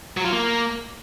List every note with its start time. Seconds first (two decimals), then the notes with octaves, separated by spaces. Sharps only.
0.17 F#3
0.25 F4
0.32 A#3